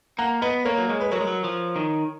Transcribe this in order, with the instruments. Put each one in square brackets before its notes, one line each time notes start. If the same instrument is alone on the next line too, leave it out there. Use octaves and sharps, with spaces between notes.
[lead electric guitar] A#3 [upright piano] F#5 A#5
[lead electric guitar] B3 [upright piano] B4 D#5
[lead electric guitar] A#3 [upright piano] A#4 C#5
[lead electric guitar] F#3
[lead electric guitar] G#3 [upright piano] C#5
[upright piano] B4
[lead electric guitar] F#3 [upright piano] A#4 C#5
[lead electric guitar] G#3
F#3
F3
D#3